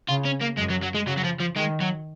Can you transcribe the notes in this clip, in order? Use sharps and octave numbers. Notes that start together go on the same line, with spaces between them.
C#3 F4
C#4
A#3
F#2 G#3
F#3
F#3
G#3
C#3 F#3
F#3
F3
F3
D#3 G#3
F#3